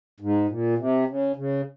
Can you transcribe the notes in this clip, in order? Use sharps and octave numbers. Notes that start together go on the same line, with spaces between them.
G#2
A#2
C3
C#3
C#3